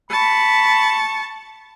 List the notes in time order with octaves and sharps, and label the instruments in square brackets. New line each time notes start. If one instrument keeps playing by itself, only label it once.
[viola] A5 C#6 [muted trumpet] B5